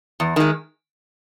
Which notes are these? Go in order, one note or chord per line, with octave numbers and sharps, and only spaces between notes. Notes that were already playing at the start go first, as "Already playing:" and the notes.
E2
D#3 G#3